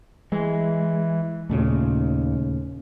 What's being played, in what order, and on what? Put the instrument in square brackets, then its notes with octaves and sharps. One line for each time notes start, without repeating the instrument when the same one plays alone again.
[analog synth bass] E3 [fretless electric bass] G#3
[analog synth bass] D#2 [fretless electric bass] A#2 C#3 A3